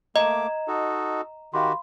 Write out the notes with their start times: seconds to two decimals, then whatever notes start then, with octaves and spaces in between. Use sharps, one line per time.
0.16 A3 A#3 D#5 A#5 D6 E7
0.68 D#4 F#4 A4
1.54 D#3 F#4 G4 F5 B5 C6